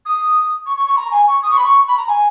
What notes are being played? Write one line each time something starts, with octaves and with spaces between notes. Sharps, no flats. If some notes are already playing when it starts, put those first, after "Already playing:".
D#6
C#6
C#6
C#6
A#5
G#5
C#6
D#6
C#6
B5
C#6
B5
A#5
G#5